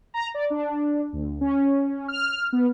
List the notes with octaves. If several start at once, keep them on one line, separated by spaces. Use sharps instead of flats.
A#5
D5
D4
D2
C#4
F6
B3